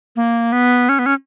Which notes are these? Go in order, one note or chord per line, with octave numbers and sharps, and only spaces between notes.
A#3
B3
C#4
B3
C#4